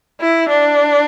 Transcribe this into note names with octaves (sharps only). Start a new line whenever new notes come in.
E4
D4